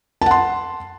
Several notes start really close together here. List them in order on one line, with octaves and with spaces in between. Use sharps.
A5 F#5 C6